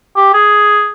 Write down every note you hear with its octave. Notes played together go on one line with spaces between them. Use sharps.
G4
G#4